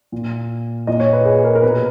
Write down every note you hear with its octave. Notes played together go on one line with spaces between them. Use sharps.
A#2
A#2 D#5
C#5
B4
G#4
A#4
A#4
B2 B4